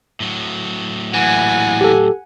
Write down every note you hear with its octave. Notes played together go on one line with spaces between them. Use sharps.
A2 F#3
A#2 E3 F#5 G#5
G4 A4